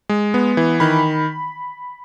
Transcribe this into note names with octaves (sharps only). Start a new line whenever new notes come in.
G#3
B3
E3
D#3 B5